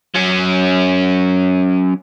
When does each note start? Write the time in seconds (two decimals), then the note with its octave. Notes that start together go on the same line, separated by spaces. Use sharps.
0.15 F#3 C#4